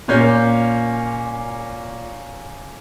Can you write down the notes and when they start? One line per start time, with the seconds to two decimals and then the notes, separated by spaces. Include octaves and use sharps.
0.08 A#2 A#3 C#4 F4 G6